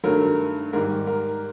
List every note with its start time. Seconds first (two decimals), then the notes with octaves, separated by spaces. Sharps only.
0.04 G2 D#3 F#3 A3 A#4
0.73 G#2 D#3 G3 A#4
1.07 A#4